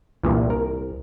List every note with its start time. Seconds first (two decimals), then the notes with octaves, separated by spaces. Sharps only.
0.23 C2 G2 A#2 E3
0.50 A#4